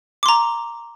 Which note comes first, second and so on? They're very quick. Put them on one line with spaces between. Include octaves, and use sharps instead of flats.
D6 C6 A#5